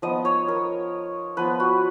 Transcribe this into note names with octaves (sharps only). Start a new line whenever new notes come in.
F3 B3 D#4 D#5
C#5
A#4
F3 B3 F4 B4
F#4